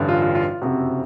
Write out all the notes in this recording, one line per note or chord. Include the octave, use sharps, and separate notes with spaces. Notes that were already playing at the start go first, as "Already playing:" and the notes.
Already playing: A1 G2 D3
F4
F4
F4
F4
F#1 F2 C3 F#4